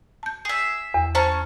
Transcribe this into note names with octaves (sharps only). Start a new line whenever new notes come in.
A5 G6
G#4 E5
E2
C#4 C5 A5 A#5 C#6